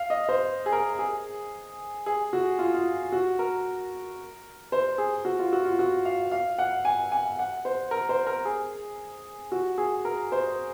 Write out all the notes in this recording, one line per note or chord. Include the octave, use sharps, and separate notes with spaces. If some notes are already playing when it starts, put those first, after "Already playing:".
Already playing: F5
D#5
C5
G#4
A#4
G#4
G#4
F#4
F4
F4
F#4
A#4
C5
G#4
F#4
F4
F#4
F4
F#4
F5
F5
F#5
G#5
G#5
F#5
C5
A#4
C5
A#4
G#4
F#4
G#4
A#4
C5